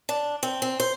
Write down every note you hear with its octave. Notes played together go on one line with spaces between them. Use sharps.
D4
C4
C4
C5